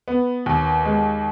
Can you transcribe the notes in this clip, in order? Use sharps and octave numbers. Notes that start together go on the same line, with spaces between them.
B3
D#2
G#3